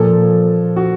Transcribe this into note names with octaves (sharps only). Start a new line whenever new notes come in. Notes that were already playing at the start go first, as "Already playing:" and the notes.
Already playing: A#2 F3 A4
F#4